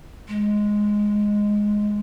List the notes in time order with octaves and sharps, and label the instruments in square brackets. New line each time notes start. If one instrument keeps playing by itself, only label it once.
[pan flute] G#3